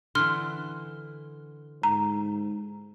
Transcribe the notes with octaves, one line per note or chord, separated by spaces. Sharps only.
D3 E3 C6 F6
G#2 A#5